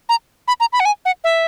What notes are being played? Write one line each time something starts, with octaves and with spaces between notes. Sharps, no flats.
A#5
B5
A#5
B5
F#5
G#5
F#5
E5